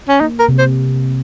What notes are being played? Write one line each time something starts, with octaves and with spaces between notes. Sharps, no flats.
C#4
A#3 D#4
A#4
C3
C5